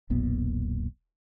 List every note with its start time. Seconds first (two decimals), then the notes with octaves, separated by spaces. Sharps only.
0.10 E1 B1 A#2 B3